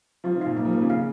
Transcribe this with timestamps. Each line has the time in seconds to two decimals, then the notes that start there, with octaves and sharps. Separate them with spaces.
0.24 F3 F4
0.35 D#3
0.41 A#2 F5
0.57 D#3 A#3
0.65 F3
0.73 A#3
0.82 C#3
0.90 F5